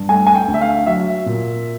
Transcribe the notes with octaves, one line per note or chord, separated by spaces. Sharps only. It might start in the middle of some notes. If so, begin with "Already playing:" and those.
Already playing: G2
A3 G#5
G#5
G5
D2
E5
F5
F#3 E5
A#2